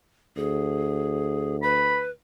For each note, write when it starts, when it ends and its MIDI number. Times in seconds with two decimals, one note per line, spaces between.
0.37 2.13 38
0.37 1.56 68
1.63 2.09 71
1.63 2.00 83